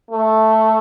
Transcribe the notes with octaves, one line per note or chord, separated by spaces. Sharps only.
A3